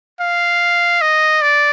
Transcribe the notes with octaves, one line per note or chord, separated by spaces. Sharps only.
F5
D#5
D5